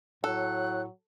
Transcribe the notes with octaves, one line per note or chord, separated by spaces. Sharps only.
A2 F#3 A4 F#6